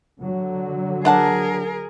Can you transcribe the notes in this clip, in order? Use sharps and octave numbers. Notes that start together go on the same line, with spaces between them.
D3 F#3
D4 G#4 A#4 F#5 A5